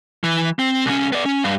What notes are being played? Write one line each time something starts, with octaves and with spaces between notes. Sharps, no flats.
E3
C4
C2 C#4
B3 D5
C#4
G2